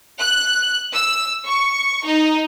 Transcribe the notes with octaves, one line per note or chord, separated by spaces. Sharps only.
F#6
E6
C#6
D#4